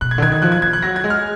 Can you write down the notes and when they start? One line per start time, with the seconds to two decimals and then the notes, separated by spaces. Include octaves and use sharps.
0.01 B2 F#6
0.11 G#6
0.18 D3
0.22 D#3 G#6
0.32 G#6
0.42 F3 F#6
0.52 G#6
0.62 F3 G#6
0.73 F#6
0.82 F#3 A#6
0.96 G#6
1.04 G#3
1.10 F6